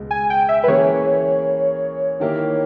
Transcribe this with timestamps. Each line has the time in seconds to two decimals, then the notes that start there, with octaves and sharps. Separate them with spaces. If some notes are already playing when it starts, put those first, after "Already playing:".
Already playing: C#2 B2 G#3
0.11 G#5
0.30 G5
0.49 E5
0.64 B4
0.68 E3 A#3 C#4 G#4 C#5
2.20 D#3 A#3 E4 G4 A#4